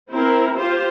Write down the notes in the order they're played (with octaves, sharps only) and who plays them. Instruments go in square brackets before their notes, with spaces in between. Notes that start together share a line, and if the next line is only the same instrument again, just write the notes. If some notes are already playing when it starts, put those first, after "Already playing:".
[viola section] C4 E4 A#4
F4 G4 C5